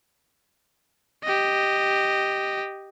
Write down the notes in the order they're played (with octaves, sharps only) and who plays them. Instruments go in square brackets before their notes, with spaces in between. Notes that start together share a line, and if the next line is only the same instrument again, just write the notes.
[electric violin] G4 D#5